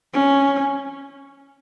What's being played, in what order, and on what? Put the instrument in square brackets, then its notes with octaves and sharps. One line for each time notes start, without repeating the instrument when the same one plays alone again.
[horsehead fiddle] C#4